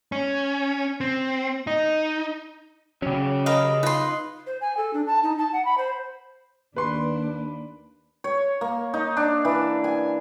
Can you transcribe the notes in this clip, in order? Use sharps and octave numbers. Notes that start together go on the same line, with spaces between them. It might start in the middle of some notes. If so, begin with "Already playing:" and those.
C#4
C4
D#4
C#3 F#3 C#4 G4
A#4 B4 D#5 F5
D#4 F4 B4 C6
C5
G#5
A4
D4
A5
D#4
A5
F#5
B5
C5
D#2 D4 B4 C6
C#5
A#3
D#4
D4
E3
G#5